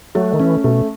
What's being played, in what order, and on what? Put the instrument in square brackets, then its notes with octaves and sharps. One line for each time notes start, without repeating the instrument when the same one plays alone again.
[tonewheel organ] F#3 [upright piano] A3
[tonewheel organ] D#3
[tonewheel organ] E3 [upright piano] C#4
[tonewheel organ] B2 [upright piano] A3